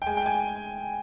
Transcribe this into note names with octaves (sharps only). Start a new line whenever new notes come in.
G5
G#3 G#5
G5
G#5